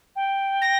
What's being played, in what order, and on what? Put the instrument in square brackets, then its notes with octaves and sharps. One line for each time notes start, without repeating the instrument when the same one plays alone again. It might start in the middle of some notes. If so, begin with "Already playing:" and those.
[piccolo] G5
[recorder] A#6